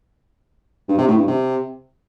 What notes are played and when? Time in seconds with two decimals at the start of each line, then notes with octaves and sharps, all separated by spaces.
0.88 G2
0.98 C3
1.08 A2
1.18 G2
1.27 C3